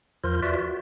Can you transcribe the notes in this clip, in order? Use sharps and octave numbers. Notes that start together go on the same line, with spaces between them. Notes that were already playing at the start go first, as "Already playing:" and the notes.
E2 F3 F4 A#4 G6
F4 F#4 B4 D5 E5
F#4